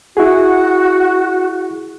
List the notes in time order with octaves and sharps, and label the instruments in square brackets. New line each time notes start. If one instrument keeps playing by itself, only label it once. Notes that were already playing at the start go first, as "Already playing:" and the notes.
[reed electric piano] E4 G#4 [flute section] F#4